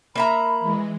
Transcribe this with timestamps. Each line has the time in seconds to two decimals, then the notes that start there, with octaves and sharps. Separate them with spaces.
0.16 A#3 E5 A#5 B5
0.60 E3 G#3